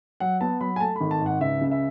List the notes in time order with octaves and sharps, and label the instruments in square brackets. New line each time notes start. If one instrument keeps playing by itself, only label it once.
[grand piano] F#3 F#5
B3 A5
F#3 B5
G#5
A3 A5
B5
G#1
A5
G#2 F#5
C#2 E5
C#3
E5